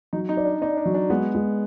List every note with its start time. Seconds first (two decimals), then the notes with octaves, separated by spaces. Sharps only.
0.13 F#3 D#4
0.29 D#4
0.37 D5
0.45 D4
0.62 D#4 D5
0.77 D4
0.86 F#3
0.94 D4
1.10 G#3 B3
1.35 G#3